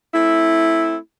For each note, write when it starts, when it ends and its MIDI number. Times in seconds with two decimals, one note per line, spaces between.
0.14 0.96 57
0.14 0.96 60
0.14 0.96 64